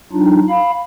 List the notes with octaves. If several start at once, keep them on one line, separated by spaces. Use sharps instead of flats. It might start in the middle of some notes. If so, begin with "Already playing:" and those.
F#3 D4 D#4 F4
F5 B5